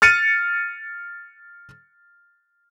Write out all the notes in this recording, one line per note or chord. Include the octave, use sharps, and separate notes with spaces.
F6 A6 C#7 D#7